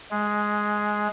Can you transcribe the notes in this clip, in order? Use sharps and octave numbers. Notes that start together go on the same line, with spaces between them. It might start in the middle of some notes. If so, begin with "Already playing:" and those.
G#3